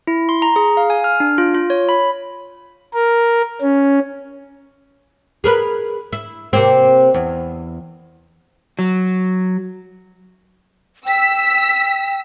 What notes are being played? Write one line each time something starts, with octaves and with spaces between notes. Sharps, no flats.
E4
C6
A#5
G#4
F5
G#5
F6
D4
F4
F4
C#5
B5
A#4
C#4
G#4 A#4 B4
E4
C3 A#3 C4
E2
F#3
G5 E6 B6